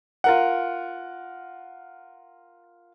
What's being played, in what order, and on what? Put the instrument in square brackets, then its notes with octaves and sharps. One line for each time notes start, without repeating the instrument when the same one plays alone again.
[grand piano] F4 A#4 F#5